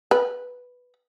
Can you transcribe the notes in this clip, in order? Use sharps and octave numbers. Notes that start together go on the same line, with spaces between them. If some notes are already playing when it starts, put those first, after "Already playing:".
B4